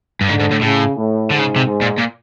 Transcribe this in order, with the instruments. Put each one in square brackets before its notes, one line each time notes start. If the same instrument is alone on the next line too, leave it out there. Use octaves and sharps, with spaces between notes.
[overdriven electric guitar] G2
[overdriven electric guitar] G#2 [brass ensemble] D3
[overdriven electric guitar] G#2
A2
[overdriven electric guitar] A2 [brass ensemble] C#3
[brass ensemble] A2
[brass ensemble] G#2 [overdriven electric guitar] D3
[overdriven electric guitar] C#3
C3
[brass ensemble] G#2
[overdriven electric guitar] A#2
A#2